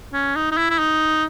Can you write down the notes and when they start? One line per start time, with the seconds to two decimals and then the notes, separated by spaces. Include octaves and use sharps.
0.14 C#4
0.36 D#4
0.52 D#4
0.57 E4
0.70 E4
0.79 D#4